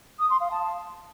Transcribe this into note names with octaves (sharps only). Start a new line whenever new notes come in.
D#6
C6
F5
A5